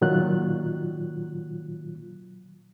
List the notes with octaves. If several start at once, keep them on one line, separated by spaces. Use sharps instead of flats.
A#2 D#3 F#3 F4 F#6